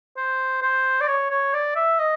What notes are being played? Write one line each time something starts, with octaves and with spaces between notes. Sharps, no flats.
C5
C5
D5
C#5
C#5
D5
E5
D#5